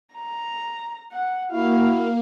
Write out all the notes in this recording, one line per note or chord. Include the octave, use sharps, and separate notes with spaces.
A#5
F#5
A#3 E4 F#4 F5